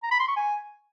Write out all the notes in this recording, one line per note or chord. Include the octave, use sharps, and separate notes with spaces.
A#5
B5
C6
C#6
G#5